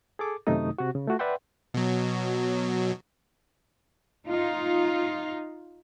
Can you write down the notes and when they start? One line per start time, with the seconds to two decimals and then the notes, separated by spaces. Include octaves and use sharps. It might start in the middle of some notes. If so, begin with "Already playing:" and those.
0.19 G#4 A4 D6
0.47 F#2 C3 D#3 A3 D#4 D#6
0.78 C3 F#4
0.95 C#3
1.07 A3 F4 F#4
1.19 B4 D5 E5 F#5 G5 C6
1.74 B2 F#3
4.27 D#4 F4